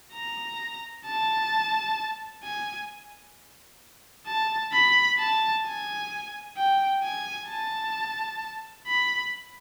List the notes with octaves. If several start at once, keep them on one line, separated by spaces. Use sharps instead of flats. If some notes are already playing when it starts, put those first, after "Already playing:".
A#5
A5
G#5
A5
B5
A5
G#5
G5
G#5
A5
B5